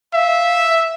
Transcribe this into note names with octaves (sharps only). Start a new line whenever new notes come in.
E5 F5